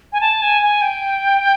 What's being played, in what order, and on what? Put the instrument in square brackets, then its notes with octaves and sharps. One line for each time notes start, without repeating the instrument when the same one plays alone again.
[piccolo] G#5
A5
G#5
G#5
G5